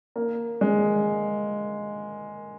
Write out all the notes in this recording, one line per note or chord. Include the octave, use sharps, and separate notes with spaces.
A#3
G#3